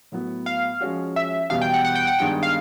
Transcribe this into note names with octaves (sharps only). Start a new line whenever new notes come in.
A2 F#3 B3
F5
F3 G#3 C#4 F#4
E5
E2 B2 G3 B3 F5
G5
F#5
F#5
G5
F#5
G2 D#3 G#3 B3 D4 G5
F5